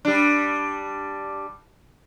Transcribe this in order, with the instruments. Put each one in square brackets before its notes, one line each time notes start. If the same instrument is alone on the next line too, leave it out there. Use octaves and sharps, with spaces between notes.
[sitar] G3 D4